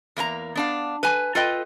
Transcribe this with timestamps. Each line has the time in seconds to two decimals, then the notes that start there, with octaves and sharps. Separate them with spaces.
0.17 E2 A#3 F4 A#5
0.55 B3 D4 F5
1.03 B4 G#5
1.35 F4 A4 B4 D#5 G5